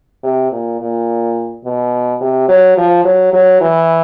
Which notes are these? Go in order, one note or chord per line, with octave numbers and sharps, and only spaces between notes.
C3
A#2
A#2
B2
C3
F#3
F3
F#3
F#3
E3